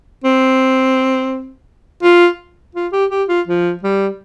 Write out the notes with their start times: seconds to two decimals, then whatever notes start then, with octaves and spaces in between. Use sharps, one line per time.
0.24 C4
2.03 F4
2.75 F4
2.93 G4
3.11 G4
3.29 F4
3.47 F3
3.83 G3